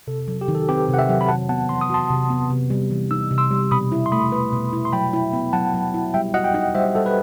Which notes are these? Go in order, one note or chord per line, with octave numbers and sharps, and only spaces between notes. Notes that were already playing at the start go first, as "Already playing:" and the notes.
C3 A4
F#3
G4
D#3
A4
C4 G4 B4
C3
F#5
E5 G5
F#3
B5
C3 F#5 A5
B3 F#5 A5
E3 C6
D#6
F#4 A5 C6
C3
B3
C3
G3
E3
D#4 E6
C3
C6 E6
G3
B2 B5 D#6
E4
C6
A3 B5 D#6
B4
B2
E4
C6
F#3 G5 B5
E4
B3
F#3 F#5 A5
F#3
E4
G3 E5 G5
F#4 D#5 F#5
G5
D#4 D#5 F#5
G3 C5 E5
G3 A4
B4